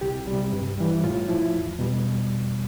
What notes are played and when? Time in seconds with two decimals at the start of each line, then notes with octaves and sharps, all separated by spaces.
0.01 C2 G4
0.27 C3 G3
0.52 G2
0.78 E3 G3
1.03 A2 F4
1.28 F3 E4
1.53 E2
1.79 B2 G3